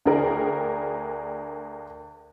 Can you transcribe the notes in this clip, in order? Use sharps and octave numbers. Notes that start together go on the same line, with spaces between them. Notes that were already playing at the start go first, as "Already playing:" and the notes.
D2 D4 G#4 A#4 G5